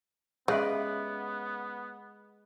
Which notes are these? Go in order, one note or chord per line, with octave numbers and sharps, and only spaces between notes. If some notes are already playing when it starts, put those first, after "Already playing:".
C#3 G#3 B3 G4 B4 D5 E5